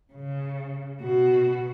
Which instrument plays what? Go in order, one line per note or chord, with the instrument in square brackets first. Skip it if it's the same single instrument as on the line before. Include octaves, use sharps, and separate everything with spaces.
[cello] C#3
B2 F#4